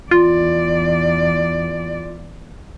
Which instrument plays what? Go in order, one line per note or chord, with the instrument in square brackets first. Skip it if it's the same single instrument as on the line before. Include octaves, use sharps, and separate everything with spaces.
[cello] E2 D5 [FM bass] F4